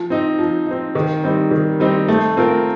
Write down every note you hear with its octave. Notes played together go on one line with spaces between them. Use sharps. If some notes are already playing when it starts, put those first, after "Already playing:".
Already playing: F3
C4 D#4
F3
C4 D#4
D#3
G3 C4 D#4
D#3
G3 C4 D#4
A3
C4 F4 A#4